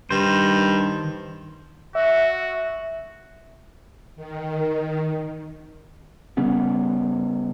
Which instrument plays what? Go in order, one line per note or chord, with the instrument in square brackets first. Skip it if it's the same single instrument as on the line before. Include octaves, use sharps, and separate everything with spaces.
[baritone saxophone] G2 [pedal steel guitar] D#3 C5
[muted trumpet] F#4 [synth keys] E5
[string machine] D#3
[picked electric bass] C#3 G3 B3 C#4